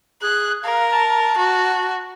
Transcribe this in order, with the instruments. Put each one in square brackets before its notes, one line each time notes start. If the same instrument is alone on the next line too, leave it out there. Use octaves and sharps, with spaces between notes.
[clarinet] G#4 [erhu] F#6
[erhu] A#4 [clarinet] F5
[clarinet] A5
[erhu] F#4